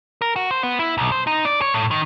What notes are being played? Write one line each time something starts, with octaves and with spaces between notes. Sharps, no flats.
A#4
F#4
C5
B3
E4
B1
C5
D#4
D5
C#5
A2
D#3